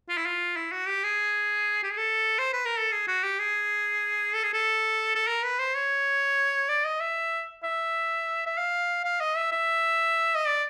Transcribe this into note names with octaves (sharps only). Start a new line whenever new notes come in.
F4
E4
F4
E4
F#4
G4
G#4
G4
G#4
A4
C5
B4
A#4
A4
G#4
F#4
G4
G#4
A4
G#4
A4
A4
A#4
B4
C5
C#5
D5
D#5
E5
E5
E5
F5
F5
D#5
E5
E5
D#5
D5